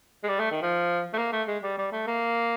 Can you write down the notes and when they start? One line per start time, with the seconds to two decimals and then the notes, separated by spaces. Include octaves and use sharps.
0.24 G#3
0.29 G3
0.40 A3
0.51 D#3
0.62 F3
1.14 A3
1.18 A#3
1.32 A3
1.47 G#3
1.63 G3
1.78 G3
1.92 A3
2.07 A#3